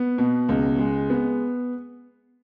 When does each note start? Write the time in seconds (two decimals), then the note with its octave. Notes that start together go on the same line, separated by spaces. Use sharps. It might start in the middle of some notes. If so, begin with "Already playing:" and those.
Already playing: B3
0.18 B2
0.49 C#2
0.79 G#3
1.10 B3